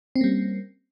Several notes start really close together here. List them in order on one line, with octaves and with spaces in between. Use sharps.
C4 C#4 A#3 G3